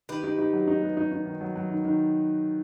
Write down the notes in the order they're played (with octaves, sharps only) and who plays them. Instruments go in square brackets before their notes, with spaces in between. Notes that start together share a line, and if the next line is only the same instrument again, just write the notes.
[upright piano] D#3 [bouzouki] G4 B4
[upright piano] D#4
D#4
F#3
D#4
B3
D#4
D#4
D#3
F#3
F#3
D#3
D#3